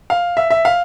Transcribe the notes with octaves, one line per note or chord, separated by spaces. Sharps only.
F5
E5
E5
F5